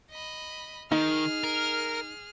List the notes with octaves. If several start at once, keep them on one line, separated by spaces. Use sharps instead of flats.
D#5 B5
D#3 D#4 G#4 F6
A#4